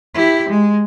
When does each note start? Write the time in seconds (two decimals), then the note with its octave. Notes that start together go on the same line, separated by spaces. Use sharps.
0.14 E4 G4
0.49 G#3